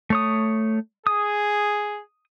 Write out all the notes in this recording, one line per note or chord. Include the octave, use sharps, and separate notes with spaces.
A3 C#5 D#6
G#4 D#6